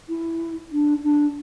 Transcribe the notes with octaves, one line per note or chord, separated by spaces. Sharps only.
E4
D4
D4